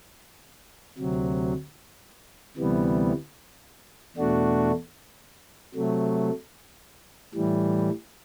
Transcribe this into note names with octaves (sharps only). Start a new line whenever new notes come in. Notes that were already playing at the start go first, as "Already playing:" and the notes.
D2 C3 F#3
D2 C3 E3 G3 B3
E2 B2 A3 D4 F#4
C3 F#3 A3
A2 E3 G3